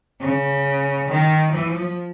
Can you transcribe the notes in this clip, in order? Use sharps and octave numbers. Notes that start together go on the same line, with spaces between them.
C#3
D#3
F3